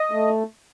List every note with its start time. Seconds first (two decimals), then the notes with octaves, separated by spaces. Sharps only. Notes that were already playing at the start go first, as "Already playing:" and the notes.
Already playing: D#5
0.11 A3